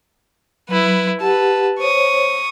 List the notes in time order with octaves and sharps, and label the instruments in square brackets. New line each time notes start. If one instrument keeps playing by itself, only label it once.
[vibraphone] F#3 [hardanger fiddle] E4 B4
[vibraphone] G4 F#5 [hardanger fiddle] B4 A5
[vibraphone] C5 C#5 [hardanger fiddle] C#6 D#6